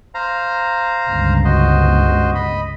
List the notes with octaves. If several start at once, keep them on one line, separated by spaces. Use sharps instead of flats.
C5 F5 A#5
G1 C#2
F#4 C5 D#5
D#5 B5